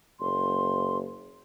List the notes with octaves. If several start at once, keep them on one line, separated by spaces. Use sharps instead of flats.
F#1 C6